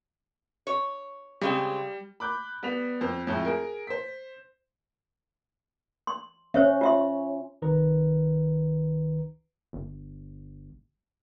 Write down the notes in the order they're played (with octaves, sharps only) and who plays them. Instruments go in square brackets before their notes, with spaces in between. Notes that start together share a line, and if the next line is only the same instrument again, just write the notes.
[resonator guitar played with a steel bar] C#5
[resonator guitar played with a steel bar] C#3 G#3 C4 [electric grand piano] G3
[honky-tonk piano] B5 D6 F#6 G6
G3 B3 B6 F7
F2 C5
F2 A2 G#3
G#4 A#4
C5 B6
[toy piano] C6
[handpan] C#4 [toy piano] C5 C#5 E5
[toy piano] F4 E5 C6
[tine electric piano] C2 D#3 B4 A#5
[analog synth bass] G1